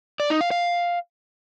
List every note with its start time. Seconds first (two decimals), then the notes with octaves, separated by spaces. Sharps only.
0.20 D5
0.30 D#4
0.41 F5
0.51 F5